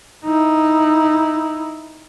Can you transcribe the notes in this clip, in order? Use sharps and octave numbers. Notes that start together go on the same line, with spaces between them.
D#4 E4